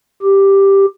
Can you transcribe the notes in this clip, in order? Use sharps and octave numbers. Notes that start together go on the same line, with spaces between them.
G4